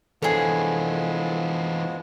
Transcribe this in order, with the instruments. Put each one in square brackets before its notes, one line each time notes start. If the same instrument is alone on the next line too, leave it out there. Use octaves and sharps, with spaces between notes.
[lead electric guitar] E3 D4 [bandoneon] F3 G#3 B3 [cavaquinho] G#4 C#5 [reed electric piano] A4